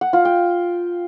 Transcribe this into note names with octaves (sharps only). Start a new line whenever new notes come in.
F#5
F4
G5